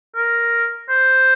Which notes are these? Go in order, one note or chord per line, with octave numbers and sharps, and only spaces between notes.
A#4
C5